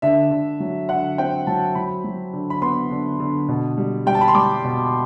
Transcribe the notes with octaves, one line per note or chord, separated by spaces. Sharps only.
D3 E5
D3
F#3
D3 F#5
C4 G5
F#3 A5
F#3 B5
F#3
D3
B5
B3 C6
D3
D3
B2
G3
G3 G5
A5
B5
C6
G3 D6
B2